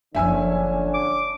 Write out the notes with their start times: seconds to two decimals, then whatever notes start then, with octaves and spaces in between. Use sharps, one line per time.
0.15 F#1 D3 F3 C#4 D4 E5 G#5 E6
0.94 D6